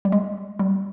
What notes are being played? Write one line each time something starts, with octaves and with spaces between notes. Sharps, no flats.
G3
G#3
G3